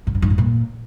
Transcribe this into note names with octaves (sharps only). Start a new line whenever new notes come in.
A2
G#2
G2
A2
A#2